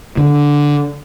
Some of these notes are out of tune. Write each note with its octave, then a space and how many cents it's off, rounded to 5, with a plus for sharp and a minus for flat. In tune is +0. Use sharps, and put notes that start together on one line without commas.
D3 -10